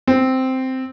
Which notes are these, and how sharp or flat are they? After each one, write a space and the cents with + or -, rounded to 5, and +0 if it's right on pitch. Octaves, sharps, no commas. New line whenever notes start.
C4 -5